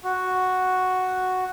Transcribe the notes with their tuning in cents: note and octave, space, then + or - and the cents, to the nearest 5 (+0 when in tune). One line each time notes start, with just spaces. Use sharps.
F#4 +0